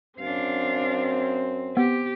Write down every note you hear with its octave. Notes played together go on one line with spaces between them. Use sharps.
F#2 C4 D4 F5
B3 G4